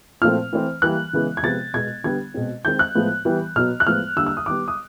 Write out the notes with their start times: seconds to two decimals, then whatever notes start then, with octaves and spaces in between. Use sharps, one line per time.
0.22 A#2 F3 A3 C4 F6
0.53 E3 A3 C4
0.82 E3 G3 A#3 F#6
1.13 C#3 E3 G#3 B3
1.37 G#6
1.43 C3 F3 G#3 B3 A6
1.74 B2 G#3 B3 G#6
2.04 D3 G3 B3 G#6
2.34 B2 G#3 C4
2.65 D#3 G#3 C4 G6
2.79 F#6
2.95 A2 F3 G#3 B3
3.25 E3 G3 B3
3.56 B2 F#3 B3 F6
3.80 F#6
3.87 A2 F3 G#3 B3 F6
4.16 D3 G3 A#3 E6
4.27 E6
4.37 D#6
4.46 D#3 G3 B3 D6
4.68 D#6